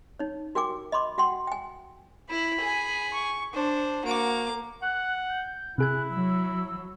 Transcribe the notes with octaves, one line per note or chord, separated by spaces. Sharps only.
D#4 C#5
F#4 A#4 G5 G#5 D6
D#5 B5 C6 D6
F#4 F#5 G5 C6
G5 G#5
E4 B5
G#4 G#5
C#6
D4 C5
A#3 F#4 D6
F#5 F#6
G6
C3 E4 G#4 G#5 F#6
F#3 E6